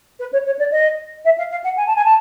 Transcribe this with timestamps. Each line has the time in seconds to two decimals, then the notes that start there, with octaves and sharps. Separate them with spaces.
0.19 B4
0.32 C#5
0.45 C#5
0.58 D5
0.71 D#5
1.24 E5
1.37 F5
1.50 F5
1.64 F#5
1.77 G#5
1.86 A5
1.95 G#5
2.04 A5